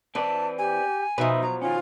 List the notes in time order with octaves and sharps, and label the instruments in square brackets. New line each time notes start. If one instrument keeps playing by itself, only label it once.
[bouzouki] E3 [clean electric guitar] C4 B4 D5 [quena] A5
[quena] G4 [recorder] G#5
[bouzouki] B2 F3 [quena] D#4 [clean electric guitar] B4 E5
[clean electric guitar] F#3 [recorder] A#5
[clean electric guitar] D#3 C#4 [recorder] F4 [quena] G#5